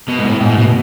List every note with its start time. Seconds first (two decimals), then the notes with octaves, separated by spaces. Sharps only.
0.09 B2
0.19 G#2
0.25 A2
0.41 G#2
0.49 A2
0.58 B2